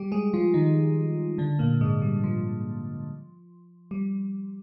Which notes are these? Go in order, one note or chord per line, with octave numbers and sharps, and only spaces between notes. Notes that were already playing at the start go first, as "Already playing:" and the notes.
Already playing: G3 G4
G#3 G#4
F3 F4
D#3 D#4
D3 D4
A#2 A#3
G#2 G#3
G3
F3
G3